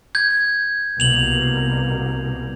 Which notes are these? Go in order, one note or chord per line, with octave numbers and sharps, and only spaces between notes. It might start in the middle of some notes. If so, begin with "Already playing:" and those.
G6 G#6
C2 B2 A#3 F7 F#7